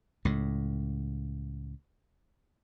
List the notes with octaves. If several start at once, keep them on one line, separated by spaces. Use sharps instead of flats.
C#2 A2